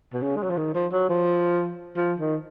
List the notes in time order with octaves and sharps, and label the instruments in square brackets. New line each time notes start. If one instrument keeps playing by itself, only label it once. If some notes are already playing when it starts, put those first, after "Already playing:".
[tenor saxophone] B2
C#3
G#3
F#3
F3
D#3
F3
F#3
F3
F3
D#3